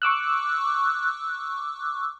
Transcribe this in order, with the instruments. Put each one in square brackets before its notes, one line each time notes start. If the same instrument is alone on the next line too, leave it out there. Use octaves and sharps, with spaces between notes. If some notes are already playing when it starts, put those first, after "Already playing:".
[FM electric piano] C#6 D6 E6 F#6